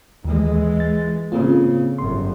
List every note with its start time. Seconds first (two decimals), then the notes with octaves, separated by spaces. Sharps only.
0.25 D#2 E3 G#3
0.80 A6
1.32 C#3 A#3 C4 F4
1.98 G1 F#2 C6